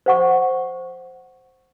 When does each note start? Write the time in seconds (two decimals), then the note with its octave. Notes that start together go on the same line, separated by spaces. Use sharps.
0.06 C5 F#5 C#6